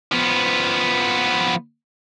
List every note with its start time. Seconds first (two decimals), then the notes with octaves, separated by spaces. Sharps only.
0.12 F3 B3